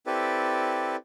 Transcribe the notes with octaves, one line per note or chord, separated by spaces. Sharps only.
C4 E4 G4 A4 B4 D5